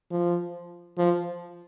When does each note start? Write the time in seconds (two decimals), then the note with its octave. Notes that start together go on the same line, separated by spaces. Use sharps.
0.11 F3
0.98 F3